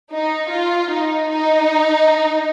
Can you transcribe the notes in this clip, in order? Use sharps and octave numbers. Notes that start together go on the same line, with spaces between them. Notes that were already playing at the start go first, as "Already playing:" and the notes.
D#4
F4
D#4
D#4